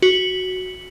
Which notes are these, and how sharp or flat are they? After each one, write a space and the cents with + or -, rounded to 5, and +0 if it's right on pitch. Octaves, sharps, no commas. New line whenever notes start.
F#4 +0